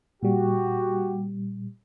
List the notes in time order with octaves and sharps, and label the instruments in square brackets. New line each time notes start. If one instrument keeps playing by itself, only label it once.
[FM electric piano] A#2 G3 [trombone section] F#4 G4